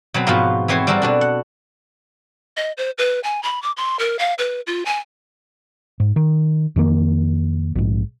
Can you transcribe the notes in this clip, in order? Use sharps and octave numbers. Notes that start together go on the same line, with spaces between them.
B2 F#3 C4 B5
G#2 B2 F3 B3 F4 F#4
E3 B3 C4 C5 C#5
G3 C4 F#4 A4 A#4
B2 D4 F#4
F#5
D#5
C5
B4
G#5
B5
D6
C6
A#4
F5
B4
F4
G#5
G#2
D#3
F2 D#3 A#3
A#1 G#2